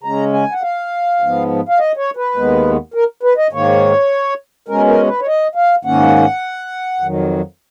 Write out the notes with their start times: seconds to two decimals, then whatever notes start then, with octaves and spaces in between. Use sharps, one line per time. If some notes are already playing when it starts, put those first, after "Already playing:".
0.03 C#3 G#3 C#4 A#5
0.33 G#5
0.52 F#5
0.62 F5
1.20 G#2 F3 B3
1.69 F5
1.79 D#5
1.97 C#5
2.17 B4
2.36 D#2 D#3 G#3 B3
2.94 A#4
3.23 B4
3.37 D#5
3.53 G#2 D#3 A#3 C#5
4.68 B2 G#3 C#4 A#4
4.88 A#4
5.07 B4
5.21 C#5
5.27 D#5
5.55 F5
5.85 G#2 D#3 A#3 C#4 F#5
7.00 F2 D#3 F#3